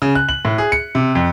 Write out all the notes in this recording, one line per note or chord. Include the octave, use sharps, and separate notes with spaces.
C#3
F#6
F#7
A2
G#4
C#7
C3
F2